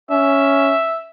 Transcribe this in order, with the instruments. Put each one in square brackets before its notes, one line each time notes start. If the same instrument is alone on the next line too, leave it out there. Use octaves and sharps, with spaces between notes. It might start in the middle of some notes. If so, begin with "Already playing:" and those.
[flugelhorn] C#4 [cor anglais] E5